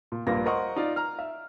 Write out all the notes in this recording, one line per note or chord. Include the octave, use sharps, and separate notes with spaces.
A#2
A#1 G2 A#2 A#3 B4 A#6
A#4 C5 D#5 F#5 C6 C#6
D#4 F4 D5
A#5 F6
E5